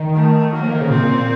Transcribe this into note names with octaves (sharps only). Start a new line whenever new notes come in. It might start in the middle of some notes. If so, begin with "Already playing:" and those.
Already playing: D#3
A3
F#3 A#3
F3
D#3
C#3
A#2 C4